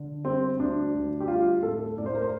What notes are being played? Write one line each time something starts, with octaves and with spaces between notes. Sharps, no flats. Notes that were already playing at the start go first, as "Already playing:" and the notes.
Already playing: D3
G3 C4
D2 D4
D2
G4
G3 F4
A2 A4
A2 D5
C5
A#4
C5